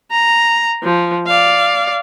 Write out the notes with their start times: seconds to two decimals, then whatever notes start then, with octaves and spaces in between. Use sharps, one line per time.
0.12 A#5
0.83 F3
1.27 D5 F5